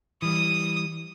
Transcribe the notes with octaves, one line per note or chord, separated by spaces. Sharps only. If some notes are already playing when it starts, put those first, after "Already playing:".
E3 G3 D#6